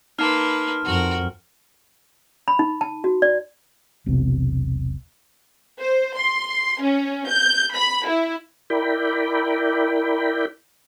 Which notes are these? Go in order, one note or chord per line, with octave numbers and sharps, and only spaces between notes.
A#3 D#4 B4 A5 C6 F6
F2 F#4 A#4
B5
D#4
A5
F#4
D5
E1 B1 C3
C5
C6
C#4
G6
B5
E4
E4 A#4 D5 G5 B5